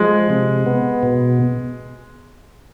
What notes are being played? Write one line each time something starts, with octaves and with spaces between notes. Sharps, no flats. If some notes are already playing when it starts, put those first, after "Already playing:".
Already playing: F3 G#3
C3
B3
B2